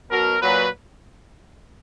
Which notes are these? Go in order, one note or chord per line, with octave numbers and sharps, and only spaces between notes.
B2 F#3 A#4
A#2 F#3 B4